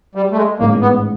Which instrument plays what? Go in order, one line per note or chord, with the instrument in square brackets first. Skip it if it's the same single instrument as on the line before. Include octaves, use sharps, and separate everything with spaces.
[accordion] G3
A3
G#3
[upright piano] A1 G#2 D#3 G#3 [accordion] A#3
[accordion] B3